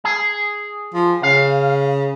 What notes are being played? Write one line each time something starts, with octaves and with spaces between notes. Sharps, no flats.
G#4
F3
C#3 F5